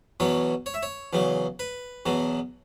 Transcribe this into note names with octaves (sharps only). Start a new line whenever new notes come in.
E2 B2 F#3 C#5
C#5
E5
C#5
E2 C#3 F#3
B4
E2 B2 F#3